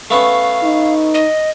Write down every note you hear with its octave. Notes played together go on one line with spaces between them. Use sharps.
A3 B3 C#4 F5
D#4
D#5